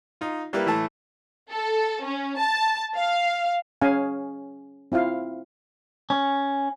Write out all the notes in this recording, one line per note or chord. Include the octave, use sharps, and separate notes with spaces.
D#4 F4
G3 A#3 E4 G4 B4
A2 E3 A3 A5
A4
C#4
A5
F5
C#4 G#4 F5 G#5
C4 E4 F4 F5
C#4